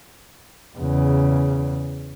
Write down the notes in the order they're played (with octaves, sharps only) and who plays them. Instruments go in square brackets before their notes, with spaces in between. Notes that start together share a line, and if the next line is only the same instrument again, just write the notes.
[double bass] E2 C#3